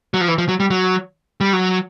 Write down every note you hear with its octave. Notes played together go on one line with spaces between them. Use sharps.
F#3
F3
E3
F3
F#3
G3
F#3
G3
F#3